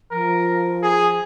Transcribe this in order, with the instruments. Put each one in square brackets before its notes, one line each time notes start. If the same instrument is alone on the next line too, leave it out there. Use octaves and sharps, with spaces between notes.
[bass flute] F3 [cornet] A#4
[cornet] G#4